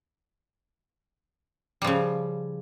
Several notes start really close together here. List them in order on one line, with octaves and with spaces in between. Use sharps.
G3 F3 C#3